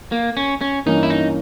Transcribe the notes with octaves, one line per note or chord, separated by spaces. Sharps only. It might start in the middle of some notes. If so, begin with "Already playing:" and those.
A#3
C#4
C#4
G2 E3 A#3 C#4 D#4
E4
D#4